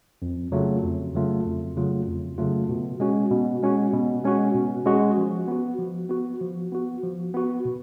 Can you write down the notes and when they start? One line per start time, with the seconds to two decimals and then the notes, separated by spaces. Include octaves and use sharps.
0.22 F2
0.52 C#3 F#3 A3 F4
0.84 F2
1.14 C#3 F#3 A3 F4
1.45 F2
1.76 C#3 F#3 A3 F4
2.07 F2
2.38 C#3 F#3 A3 F4
2.69 B2
3.00 G#3 C#4 F#4
3.31 B2
3.63 G#3 C#4 F#4
3.93 B2
4.24 G#3 C#4 F#4
4.55 B2
4.86 G#3 C#4 F#4
5.18 F3
5.48 B3 F#4
5.79 F3
6.09 B3 F#4
6.41 F3
6.72 B3 F#4
7.03 F3
7.34 B3 F#4
7.65 B2